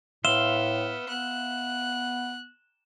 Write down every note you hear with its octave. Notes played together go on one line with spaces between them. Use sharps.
A2 B3 E5 F5 C6 E7 G7
B3 F#6